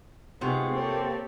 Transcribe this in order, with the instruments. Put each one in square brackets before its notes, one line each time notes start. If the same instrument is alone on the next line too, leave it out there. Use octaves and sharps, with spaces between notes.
[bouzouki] C3 F4 F#4 [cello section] B3 D#4 G#4
[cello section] A#3 G4 A4 [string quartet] C4 C#5